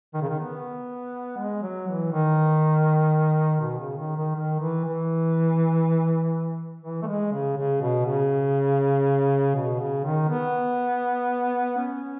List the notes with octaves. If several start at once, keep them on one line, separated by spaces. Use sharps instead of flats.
D#3
C#3
D#3
B3
G#3
F#3
E3
D#3
B2
C#3
D#3
D#3
D#3
E3
E3
E3
A3
G#3
C#3
C#3
B2
C#3
B2
C#3
D#3
B3
C#4